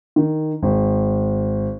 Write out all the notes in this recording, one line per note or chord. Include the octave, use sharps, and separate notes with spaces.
D#3
G#1